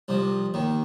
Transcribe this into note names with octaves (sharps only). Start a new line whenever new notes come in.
C2 C3 F3
D#2 D#3